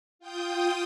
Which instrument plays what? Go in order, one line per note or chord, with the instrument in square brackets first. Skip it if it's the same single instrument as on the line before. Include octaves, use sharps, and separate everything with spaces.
[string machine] F4 G5 D#6 G6